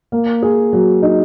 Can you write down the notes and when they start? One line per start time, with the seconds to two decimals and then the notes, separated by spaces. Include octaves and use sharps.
0.12 A#3
0.43 G#4
0.73 F#3
1.02 D#4